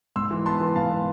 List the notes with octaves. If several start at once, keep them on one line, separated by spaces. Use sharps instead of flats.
G#2 C6 E6
E3
B3 A5 C6
E3
G#2 F5 A5
B3